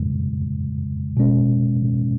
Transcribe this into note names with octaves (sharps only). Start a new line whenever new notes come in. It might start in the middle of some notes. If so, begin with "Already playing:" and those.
Already playing: F2 C#3 G#3
B2 G#3 C#4